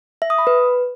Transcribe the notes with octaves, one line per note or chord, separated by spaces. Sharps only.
E5
D#6
B5
B4